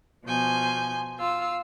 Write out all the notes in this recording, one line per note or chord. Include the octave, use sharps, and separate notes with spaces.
B2 F3 G#5 G6
F4 F5 E6